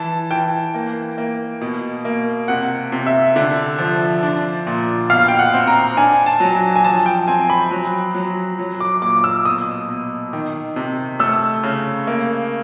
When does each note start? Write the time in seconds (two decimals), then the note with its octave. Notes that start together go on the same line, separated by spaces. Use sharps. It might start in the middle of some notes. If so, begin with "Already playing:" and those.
Already playing: E3 A5
0.31 E3 G5
0.74 A#3
1.18 A#3
1.61 B2
2.05 A#3
2.48 C3 F#5
2.92 C3
3.06 E5
3.36 D3
3.79 F3
4.23 D4
4.67 A#2
5.10 B2 F5
5.28 G5
5.39 F#5
5.54 C4
5.67 A#5
5.97 D4 G#5
6.26 A5
6.40 F#3
6.76 G#5
6.84 F3 A5
7.06 G5
7.28 C4 G#5
7.50 B5
7.71 F#3
8.15 F#3
8.59 F#3
8.80 D6
9.02 A#2 D6
9.24 E6
9.45 B2 D#6
9.89 B2
10.33 D#3
10.76 C3
11.19 A3 E6
11.63 C#3
12.07 A#3